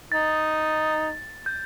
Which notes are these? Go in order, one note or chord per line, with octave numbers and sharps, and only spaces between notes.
D#4 A6
G6